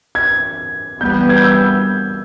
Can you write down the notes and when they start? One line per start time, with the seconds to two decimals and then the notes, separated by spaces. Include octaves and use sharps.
0.15 G#6
1.01 E3 G3 B3 G6
1.29 G#6
1.36 G6
1.44 E6